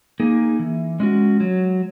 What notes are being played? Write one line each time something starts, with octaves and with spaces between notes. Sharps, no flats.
A#3 D#4 G#4
E3
G#3 C#4 F#4
F#3